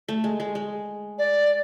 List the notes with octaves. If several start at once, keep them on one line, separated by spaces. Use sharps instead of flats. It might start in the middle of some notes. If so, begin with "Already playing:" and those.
A3
G#3
G#3
G#3
D5